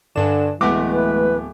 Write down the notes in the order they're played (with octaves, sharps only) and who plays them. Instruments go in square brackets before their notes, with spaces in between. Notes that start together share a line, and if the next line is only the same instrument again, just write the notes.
[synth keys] G2 E7 [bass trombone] D3 [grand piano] D4 G#5
[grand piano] D1 B3 D6 [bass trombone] E3 [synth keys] G#3 A3
[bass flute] B4